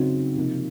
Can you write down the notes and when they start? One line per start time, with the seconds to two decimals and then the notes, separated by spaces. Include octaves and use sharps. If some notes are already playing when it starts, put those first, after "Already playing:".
Already playing: C#3 F#3 C4 D#4 F#4
0.35 C3 F3 A#3 D#4